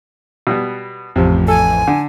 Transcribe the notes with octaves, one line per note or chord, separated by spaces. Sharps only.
B2 G3 B3
A1 F2 C3 F3
A4 G#5
D3